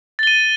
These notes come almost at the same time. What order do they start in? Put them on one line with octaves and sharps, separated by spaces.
A6 G7 D#7